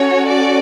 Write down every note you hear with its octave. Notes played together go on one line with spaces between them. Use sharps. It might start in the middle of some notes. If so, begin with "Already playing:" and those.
Already playing: C#4 F#4 A4 C#5
D5